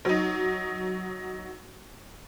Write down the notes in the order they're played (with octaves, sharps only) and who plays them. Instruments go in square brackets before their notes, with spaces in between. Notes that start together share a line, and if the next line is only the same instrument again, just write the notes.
[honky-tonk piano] F#3 D#4